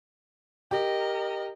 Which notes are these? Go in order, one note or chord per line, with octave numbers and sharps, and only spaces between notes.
G4 A#4 D#5